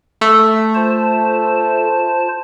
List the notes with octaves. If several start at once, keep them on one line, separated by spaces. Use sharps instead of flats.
A3
F4 C5 A5